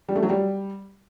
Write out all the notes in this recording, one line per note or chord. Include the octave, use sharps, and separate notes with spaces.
G3
A3
F#3
G3